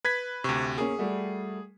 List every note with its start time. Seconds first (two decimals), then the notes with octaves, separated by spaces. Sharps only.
0.05 B4 G#6 B6
0.44 D2 C3 C#6
0.78 A#3 C#4 G#4
0.98 G3 A3 F#4